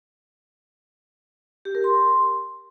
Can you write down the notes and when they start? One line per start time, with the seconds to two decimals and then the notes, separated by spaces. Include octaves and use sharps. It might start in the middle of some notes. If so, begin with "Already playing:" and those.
1.65 G4
1.75 A#4
1.84 C6